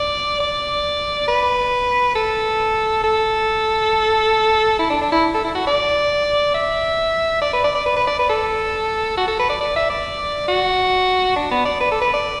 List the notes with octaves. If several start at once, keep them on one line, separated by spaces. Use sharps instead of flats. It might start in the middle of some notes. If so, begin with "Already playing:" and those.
Already playing: D5
D5
B4
A4
A4
E4
D4
D4
E4
A4
E4
F#4
D5
E5
D5
B4
D5
D5
B4
B4
D5
B4
A4
F#4
A4
B4
D5
D5
E5
D5
F#4
D4
B3
D5
B4
A4
B4
D5